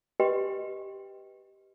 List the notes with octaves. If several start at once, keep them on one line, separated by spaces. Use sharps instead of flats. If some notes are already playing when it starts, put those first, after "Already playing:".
G4 B4 D#5 G5 C6